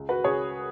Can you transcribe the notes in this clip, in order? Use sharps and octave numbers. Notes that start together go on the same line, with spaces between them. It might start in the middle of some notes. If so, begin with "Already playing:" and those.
Already playing: C#2
F#4 B4
C#3 G#4 C#5